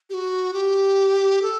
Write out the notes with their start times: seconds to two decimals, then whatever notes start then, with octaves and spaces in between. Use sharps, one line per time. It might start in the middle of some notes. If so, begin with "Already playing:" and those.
0.10 G4
0.14 F#4
0.53 G4
1.42 A4